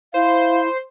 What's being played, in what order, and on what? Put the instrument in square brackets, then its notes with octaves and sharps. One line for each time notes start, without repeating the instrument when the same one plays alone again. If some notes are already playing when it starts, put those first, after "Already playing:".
[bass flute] E4 [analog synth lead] C5 [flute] F5